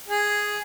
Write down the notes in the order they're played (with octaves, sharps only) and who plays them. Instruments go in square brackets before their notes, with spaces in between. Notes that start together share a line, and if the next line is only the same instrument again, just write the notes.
[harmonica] G#4